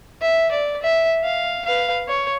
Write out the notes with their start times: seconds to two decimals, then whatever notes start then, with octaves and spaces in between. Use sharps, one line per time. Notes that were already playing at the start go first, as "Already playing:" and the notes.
0.22 E5
0.51 D5
0.82 E5
1.24 F5
1.65 B4 F5
2.08 C#5